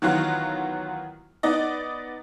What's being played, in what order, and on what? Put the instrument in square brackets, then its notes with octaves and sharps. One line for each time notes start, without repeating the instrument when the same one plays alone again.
[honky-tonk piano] D#3 E3 F#3 B3 F4 F#4
B3 D#4 D5 D#5